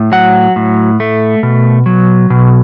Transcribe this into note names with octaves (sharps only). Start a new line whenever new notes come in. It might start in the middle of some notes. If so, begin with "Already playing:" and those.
Already playing: A2
F#3 F#5
A2
A3
B2
F#3
B2